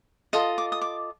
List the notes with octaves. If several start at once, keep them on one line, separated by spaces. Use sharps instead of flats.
F4 A4 D#5 D#6
D6
D#6
D6